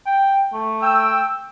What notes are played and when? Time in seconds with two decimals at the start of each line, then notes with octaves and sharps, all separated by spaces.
0.06 G5
0.53 A3
0.82 G5 E6